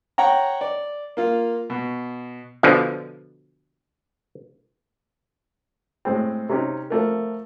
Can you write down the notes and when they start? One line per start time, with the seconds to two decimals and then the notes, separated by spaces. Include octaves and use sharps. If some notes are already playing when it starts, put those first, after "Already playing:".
0.18 C#5 F#5 G5 A#5
0.61 D5
1.17 A#3 F4
1.70 B2
2.63 B2 D3 F3
6.05 A2 G#3 C4
6.49 C3 C#4 D#4
6.90 F3 A3 A#4